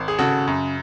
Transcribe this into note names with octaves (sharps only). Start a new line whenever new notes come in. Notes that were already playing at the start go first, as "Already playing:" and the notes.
Already playing: G#1
G#4
C#3 F#4 A4
F#2